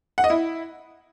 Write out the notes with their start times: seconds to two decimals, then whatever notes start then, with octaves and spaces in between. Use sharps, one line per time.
0.18 F#5
0.24 D#5
0.30 E4